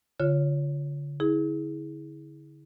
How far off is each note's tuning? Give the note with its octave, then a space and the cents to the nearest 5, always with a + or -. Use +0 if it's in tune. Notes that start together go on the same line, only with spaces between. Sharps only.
D3 -30 F4 -5 C#5 +0
E4 -40 G#4 +0